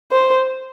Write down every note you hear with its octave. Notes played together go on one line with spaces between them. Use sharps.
C5